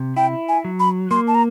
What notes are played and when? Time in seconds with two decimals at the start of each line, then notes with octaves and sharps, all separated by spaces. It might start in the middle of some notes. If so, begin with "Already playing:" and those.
Already playing: C3
0.17 E4 G5
0.49 G#5
0.65 F#3
0.80 B5
1.11 A#3 C6
1.28 A5
1.35 A#5